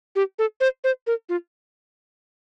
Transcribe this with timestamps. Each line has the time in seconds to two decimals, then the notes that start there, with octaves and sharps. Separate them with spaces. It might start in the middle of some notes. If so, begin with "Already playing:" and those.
0.16 G4
0.39 A4
0.60 C5
0.84 C5
1.07 A#4
1.29 F4